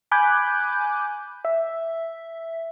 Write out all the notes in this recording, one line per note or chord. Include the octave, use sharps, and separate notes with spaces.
G#5 B5 D6 F#6 G6
E5